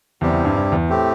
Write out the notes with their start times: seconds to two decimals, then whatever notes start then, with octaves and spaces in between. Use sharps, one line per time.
0.21 E2 C3 G3 C4 G4
0.33 E2
0.45 G2
0.56 G2
0.72 E2
0.89 A2 A3 C4 G4